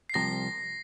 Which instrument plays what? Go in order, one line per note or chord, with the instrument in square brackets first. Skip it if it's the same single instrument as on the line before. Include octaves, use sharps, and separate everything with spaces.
[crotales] C7
[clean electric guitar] C2 C3 F3 [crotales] A#6